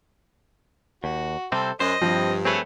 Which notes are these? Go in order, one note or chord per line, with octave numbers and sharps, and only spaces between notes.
D#2 F#4
C3 G3 C4 A4 C5
F#2 C5 D#5
G2 F3 C4
A3 C4 G#4 B4 C#5